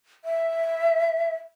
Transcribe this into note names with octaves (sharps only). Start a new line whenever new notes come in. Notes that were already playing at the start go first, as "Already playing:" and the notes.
E5